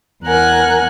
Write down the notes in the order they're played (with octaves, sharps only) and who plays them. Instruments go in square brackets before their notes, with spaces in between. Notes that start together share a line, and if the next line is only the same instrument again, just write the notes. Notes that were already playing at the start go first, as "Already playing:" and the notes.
[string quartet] E2 A#4 F#5 G#5 F#6